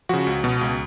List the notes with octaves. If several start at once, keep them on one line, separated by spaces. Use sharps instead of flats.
C#3 F3 F#4
C#2
B2
C#2